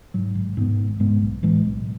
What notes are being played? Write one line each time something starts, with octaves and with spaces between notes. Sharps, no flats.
G#2 F#3
G#1
G#2 G#3 B3
G#1
G#2 G#3 B3
B1
A2 E3 G#3
B1